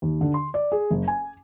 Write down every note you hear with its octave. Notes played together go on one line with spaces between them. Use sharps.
D#2
D3
C6
D5
G#4
F#1
G#5